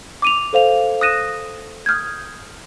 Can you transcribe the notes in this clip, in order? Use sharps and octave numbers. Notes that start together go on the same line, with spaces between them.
D6 D#7 F7
A4 C5 F5 F7
D#6 F#6 A#6 D#7 E7
D#6 F6 G6 G#6